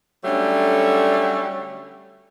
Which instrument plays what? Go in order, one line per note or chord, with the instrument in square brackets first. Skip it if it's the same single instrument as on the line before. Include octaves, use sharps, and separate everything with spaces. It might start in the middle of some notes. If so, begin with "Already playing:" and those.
[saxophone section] D3 F#3 G3 A3 C#4